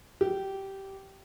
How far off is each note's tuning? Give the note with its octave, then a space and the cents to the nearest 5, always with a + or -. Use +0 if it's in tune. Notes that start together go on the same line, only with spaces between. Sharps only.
G4 -15